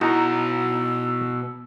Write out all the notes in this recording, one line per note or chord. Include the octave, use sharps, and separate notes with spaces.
B2 D#4 E4 F#4 G#4 A5 A#5 E6